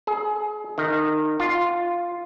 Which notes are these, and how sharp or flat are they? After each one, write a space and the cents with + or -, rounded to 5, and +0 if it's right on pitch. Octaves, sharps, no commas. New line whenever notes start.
G#4 +30
D#3 -20
F4 +0